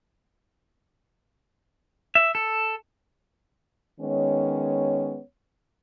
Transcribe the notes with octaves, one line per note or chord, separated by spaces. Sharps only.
E5
A4
D#3 G#3 B3 C#4 C#5